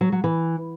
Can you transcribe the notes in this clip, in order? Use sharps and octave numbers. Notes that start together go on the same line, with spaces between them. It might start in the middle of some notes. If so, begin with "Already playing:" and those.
F#3
F#3
E3